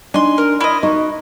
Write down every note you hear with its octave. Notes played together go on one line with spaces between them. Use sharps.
D4 D#4 G#5 C6
A#4
E4 D#5
D#4 F#4